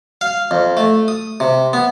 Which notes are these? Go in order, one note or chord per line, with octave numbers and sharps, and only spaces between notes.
F5
F2
A3
D#6
C3
B3